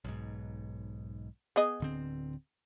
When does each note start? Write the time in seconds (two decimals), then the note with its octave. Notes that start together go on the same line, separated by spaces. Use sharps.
0.05 B1 G#2
1.56 B3 G#4 D#5
1.80 D1 D3 C4